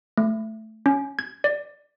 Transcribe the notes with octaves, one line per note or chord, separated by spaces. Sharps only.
A3
C#4
G#6
D5